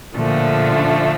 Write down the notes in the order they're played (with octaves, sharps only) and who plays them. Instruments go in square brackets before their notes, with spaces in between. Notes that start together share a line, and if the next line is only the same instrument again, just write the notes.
[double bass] A#2 [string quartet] D3 F3 A3 D4